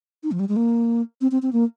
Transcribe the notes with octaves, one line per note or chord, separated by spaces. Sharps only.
D#4
F3
G3
G#3
A#3
C4
C4
C4
A#3